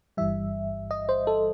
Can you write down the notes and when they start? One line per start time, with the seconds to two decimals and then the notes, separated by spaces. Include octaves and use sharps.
0.17 G1 G2 E3 G3 E5
0.91 D#5
1.09 C5
1.27 A4